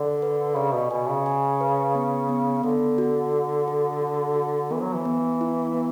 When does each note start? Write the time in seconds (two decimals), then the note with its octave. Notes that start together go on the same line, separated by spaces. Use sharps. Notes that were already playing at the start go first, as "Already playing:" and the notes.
Already playing: D3 D5
0.22 B4
0.56 C#3 D5
0.74 B2
0.90 B2 G#5
1.09 C#3
1.26 G#5
1.61 B4
1.95 B3
2.29 B3
2.63 D3 B3
2.98 F#4
3.33 F#4
3.68 A4
4.01 F#4
4.36 F#4
4.71 E3 B3
4.83 F#3
4.95 E3
5.05 B3
5.41 E4
5.74 B3